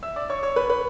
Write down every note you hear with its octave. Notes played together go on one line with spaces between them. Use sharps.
E5 E6
D5 D6
C#5 C#6
C#5 C#6
B4 B5
B4 B5